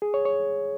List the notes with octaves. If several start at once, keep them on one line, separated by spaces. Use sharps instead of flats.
G#4
C#5
C#5